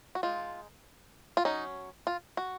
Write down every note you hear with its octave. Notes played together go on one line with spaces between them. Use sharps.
F#4
G#3 D#4 F4
F4
F#3 C#4 D#4
F4
F#4